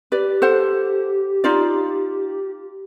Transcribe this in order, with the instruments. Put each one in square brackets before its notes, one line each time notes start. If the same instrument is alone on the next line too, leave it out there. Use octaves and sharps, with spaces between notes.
[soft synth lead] G4 [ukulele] B4 D5
[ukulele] A4 C5 F#5
D#4 F4 D5